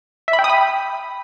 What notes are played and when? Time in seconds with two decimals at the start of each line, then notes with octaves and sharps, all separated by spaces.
0.28 E5
0.33 B5
0.39 G5
0.44 D#6
0.50 B5